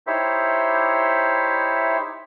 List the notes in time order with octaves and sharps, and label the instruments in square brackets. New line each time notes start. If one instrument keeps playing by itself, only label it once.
[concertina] D#4 E4 G4 C5 C#5 E5